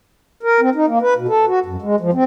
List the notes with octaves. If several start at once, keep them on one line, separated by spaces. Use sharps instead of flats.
A#4
C4
D#4
A#3
B4
B2
A4
F#4
F#2
G#3
F3
C4